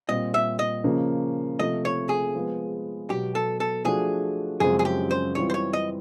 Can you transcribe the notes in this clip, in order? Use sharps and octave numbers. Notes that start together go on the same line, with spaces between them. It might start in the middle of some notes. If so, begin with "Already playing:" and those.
A#2 G3 C4 D#5
E5
D#5
C#3 F3 A#3 C#4
C3 F3 A3 D#5
C#5
G#4
F3 G#3 B3
B2 F#3 B3 G4
A4
A4
F3 A3 D4 F#4 G#4
F#2 C#3 F3 G#3 C4 G#4
G#4
G4
C5
E3 G3 C4 F4 C#5
C5
C#5
D#5